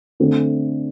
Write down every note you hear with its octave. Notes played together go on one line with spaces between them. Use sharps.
D3 A3 C4